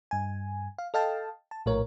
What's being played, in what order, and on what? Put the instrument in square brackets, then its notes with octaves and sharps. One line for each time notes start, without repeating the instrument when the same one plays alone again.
[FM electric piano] G2 G#5
F5
A4 D#5 F5 G5 A5
A5
A#1 A2 A#4 C#5